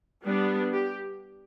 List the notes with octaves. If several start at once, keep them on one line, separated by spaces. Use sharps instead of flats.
G3 B3 D4
G4